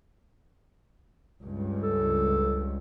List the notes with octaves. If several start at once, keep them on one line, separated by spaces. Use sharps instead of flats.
C#2 G2
A4